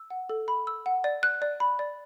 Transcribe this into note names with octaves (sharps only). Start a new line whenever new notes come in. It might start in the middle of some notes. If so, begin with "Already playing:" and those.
Already playing: E6
F#5
A4
B5
E6
F#5
D5
F#6
D5
B5
D5